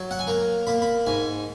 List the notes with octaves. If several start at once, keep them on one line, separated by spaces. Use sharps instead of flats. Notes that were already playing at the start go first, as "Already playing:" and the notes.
Already playing: F#3
F#5
G#5
A#3 A#5
A#3 B5
B5
G#2 G#5